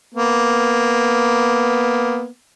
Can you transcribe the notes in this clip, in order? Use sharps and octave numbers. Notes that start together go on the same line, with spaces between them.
A#3 B3